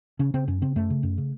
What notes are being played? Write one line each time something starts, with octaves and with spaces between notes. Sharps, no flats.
C#3 C#4
C#3 C4
F#2 C#4
C#3 C4
F#2 A3
C#3
F#2
C#3